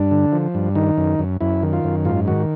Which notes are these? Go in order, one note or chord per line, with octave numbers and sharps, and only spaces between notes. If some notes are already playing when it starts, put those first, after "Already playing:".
Already playing: G2 D4
D3
F3
G2
D#3 D#4
F#2
F#2
F#2 E4
D#3
F4
F#2
G#2 F4
D#3 F#4